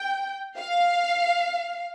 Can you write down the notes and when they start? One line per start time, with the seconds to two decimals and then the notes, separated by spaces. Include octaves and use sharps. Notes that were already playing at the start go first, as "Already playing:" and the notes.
Already playing: G5
0.57 F5